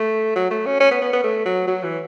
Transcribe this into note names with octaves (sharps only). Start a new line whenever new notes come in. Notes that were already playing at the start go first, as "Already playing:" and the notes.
Already playing: A3
F#3
A3
C#4
C#4
B3
B3
B3
A3
F#3
F#3
E3